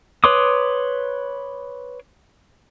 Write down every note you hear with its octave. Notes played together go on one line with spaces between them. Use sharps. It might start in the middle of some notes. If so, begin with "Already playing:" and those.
B4 C#5 C6 D6 D#6